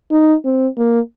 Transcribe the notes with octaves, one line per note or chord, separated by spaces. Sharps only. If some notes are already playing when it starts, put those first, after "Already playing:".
D#4
C4
A#3